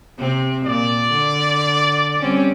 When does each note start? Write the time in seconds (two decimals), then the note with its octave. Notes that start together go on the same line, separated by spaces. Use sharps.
0.18 C3 C4
0.65 A#2 D5
1.11 D3
2.19 G3 C4 C#4